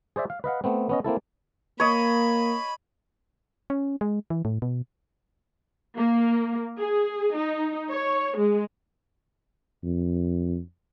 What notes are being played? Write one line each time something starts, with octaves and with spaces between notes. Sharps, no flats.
G#4 C5 D5 E5
F5
B4 D#5 F5 F#5
A3 B3 C4
B3 C#4 D#5
A#3 C4 E4 A4
A#3 C#5 D#5 B5
C#4
G#3
E3
A2
B2
A#3
G#4
D#4
C#5
G#3
F2